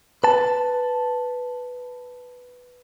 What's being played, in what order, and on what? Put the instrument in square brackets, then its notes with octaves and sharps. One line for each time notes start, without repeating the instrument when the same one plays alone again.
[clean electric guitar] B4 A5